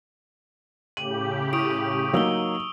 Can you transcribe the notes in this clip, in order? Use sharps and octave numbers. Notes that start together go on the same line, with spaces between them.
A2 C#3 G4 D#7 F#7
E4 C#6 D#6 D7
F#3 A#3 D#4 D#6 E6 G7